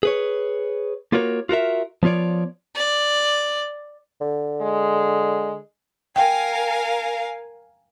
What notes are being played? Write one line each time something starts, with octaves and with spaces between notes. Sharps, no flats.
G#4 B4 C#5
A#3 F4 F#4 A#4 C#5
F4 F#4 A#4 E5
F3 B3 F4 C#5 D5
D5
D3
G#3
A#4 F5 G5 G#5